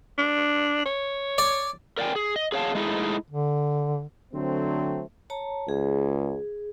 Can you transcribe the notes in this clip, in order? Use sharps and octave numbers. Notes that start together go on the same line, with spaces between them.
D4
C#5
D5
A#4 D5 E5 G5 G#5
G#4
D#5
G#4 C#5 F5 A5
G#3 A3 D#4 E4 G#4
D3
D3 F#3 A3 C4
C#5 A5 A#5
C#2 G#4